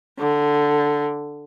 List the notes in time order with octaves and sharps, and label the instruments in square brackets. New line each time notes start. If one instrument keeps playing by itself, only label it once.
[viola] D3